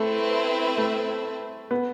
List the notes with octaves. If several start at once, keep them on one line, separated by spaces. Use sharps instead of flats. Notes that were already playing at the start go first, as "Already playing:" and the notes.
Already playing: A3 C4 E4 B4 E5
A3
B3